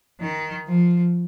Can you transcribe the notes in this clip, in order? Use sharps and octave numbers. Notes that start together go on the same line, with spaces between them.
D#3
F3